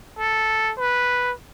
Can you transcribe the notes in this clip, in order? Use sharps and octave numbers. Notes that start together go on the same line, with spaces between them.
A4
B4